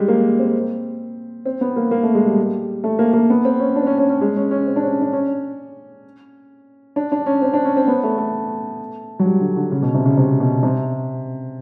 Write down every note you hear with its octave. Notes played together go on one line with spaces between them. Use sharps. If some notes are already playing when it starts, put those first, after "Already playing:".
Already playing: G3 G#3
A#3
C4
C4
B3
A#3
A#3
A3
G#3
G3
A3
A#3
A#3
B3
C4
C#4
D4
C4
C#4
C#4
C#4
G#3
C#4
C#4
C4
D4
C#4
D4
C#4
D4
D4
C#4
C4
D4
C#4
C4
B3
A3
A3
F#3
G3
D3
D3
C#3
B2
C3
C#3
C3
B2
C3